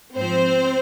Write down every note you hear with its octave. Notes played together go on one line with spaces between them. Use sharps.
G#2 F3 C4 C5